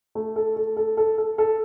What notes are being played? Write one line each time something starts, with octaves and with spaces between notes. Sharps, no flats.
A3
A4
A4
A4
A4
A4
A4